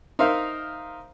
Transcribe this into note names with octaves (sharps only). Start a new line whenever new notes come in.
D#4 A#4 C5 E5 F5